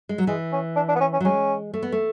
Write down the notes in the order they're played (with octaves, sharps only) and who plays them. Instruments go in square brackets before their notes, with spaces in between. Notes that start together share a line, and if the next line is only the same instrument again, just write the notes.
[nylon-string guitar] G#3
F#3
[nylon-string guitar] E3 [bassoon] G#3
[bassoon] C#4
D4
D4
B3
C#4
C#4
[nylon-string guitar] F#3
[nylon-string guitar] G#3 [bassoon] C#4
[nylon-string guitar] A3
B3
A3